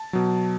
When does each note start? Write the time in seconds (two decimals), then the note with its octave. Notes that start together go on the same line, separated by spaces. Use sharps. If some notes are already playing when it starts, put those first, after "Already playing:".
Already playing: A5
0.13 B2 F#3